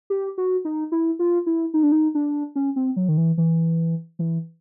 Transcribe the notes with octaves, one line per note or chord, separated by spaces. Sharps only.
G4
F#4
D#4
E4
F4
E4
D#4
D4
D#4
D4
C#4
C4
F#3
D#3
E3
E3
E3